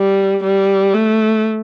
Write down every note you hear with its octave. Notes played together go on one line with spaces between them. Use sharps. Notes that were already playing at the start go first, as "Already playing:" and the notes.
Already playing: G3
G3
A3